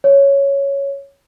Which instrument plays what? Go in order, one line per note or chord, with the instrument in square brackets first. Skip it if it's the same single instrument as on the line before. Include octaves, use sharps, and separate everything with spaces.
[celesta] C#5